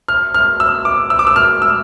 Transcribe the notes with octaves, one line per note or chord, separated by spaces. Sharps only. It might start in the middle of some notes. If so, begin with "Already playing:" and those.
F6
F6
E6
D6
E6
D6
E6
F6
E6